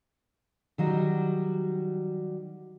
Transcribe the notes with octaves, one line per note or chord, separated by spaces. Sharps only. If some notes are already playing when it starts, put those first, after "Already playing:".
D#3 F#3 G3 F#4